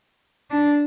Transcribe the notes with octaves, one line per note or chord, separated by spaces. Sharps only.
D4